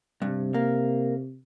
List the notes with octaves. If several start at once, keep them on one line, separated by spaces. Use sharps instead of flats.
G2 C3
A#3